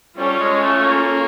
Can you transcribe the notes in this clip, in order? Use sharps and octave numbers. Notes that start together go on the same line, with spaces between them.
G3 C#4 F4 A4 C#5
G#3
A3
A#3